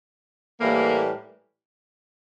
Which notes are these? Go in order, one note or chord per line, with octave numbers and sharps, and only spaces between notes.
A2 E3 G3 A#3